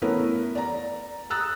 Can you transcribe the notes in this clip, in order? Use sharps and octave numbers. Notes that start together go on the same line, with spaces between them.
A3 B3 C#4 E4 A#4 B4
D5 A#5
A#5 D#6 E6 F#6 A6